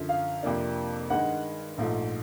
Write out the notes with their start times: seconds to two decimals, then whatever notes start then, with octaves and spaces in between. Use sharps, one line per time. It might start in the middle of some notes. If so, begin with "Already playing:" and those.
Already playing: F#2 D3 F3
0.09 F5
0.43 F2 C3 F3 A#3 D4
1.10 G2 D#3 G#3 F#5
1.78 A#1 G#2 F3 A3